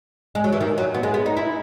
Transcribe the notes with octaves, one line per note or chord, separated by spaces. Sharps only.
G#3
F#3
E3
D#3
F#3
B3
G#3
B3
D#4
E4